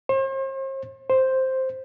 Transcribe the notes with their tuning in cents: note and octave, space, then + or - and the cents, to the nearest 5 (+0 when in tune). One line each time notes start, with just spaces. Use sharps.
C5 +45
C5 +5